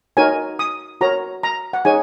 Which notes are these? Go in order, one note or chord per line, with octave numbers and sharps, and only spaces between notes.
D#4 F#4 A#4 C#5 G#5
D#6
F#4 A#4 C#5 A#5
A#5
F#5
D#4 G#4 C#5 G#5